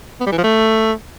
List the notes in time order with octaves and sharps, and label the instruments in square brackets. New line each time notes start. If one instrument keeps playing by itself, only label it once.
[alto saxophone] B3
G3
E3
F3
A3